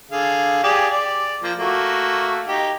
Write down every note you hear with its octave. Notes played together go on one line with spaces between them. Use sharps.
D3 G#4 F5
G4 G#4 D5
D5
F3 A#3
A3 A#3 F#4
D#4 G4